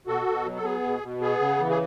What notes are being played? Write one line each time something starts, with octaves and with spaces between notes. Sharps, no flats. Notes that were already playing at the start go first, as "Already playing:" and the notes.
B2 F#4 A4
B2
F#3
A4
B3 G#4
B2
B2
B3 G#4
C#3
E3
G#4